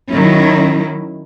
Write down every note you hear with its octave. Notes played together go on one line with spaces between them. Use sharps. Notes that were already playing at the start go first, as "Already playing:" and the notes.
D#3 F#3 C#4 E4